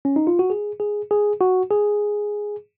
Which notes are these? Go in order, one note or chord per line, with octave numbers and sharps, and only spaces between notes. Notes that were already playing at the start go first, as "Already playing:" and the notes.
C#4
D#4
F4
F#4
G#4
G#4
G#4
F#4
G#4